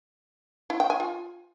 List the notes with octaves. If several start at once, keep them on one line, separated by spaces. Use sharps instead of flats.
E4
G5
G#5
F4